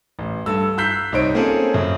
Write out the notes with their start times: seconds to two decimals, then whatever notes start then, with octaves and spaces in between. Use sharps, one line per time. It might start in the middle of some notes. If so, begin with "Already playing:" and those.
0.19 A1
0.46 G2 A4 E6
0.78 A#5 E6 F#6 G6 B6 C7
1.12 C2 D#4 C5 C#5 D7
1.34 A#3 C4 C#4 F4 G#4 A4
1.74 F#2 C#3